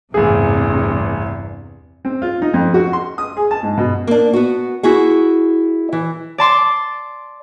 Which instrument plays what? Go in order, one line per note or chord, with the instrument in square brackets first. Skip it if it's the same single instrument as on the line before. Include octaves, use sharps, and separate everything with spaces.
[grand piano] A1 G#4 [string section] E2 G2 C3
[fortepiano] C4
F4
D#4
F2
F#4
C6
D#6
G#4
A5
G#2
B2
[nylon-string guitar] A#3 D4
B3 F#4
E4 F#4 G#4 F#5
E3
[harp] D5 A5 C6 D6